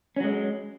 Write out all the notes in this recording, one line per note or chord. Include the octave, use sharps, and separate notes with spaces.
F#3 G#3 C#4